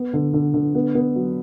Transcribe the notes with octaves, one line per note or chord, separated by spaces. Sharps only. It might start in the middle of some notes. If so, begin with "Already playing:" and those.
Already playing: B3
D3
D3
D3
B3
B3
F#3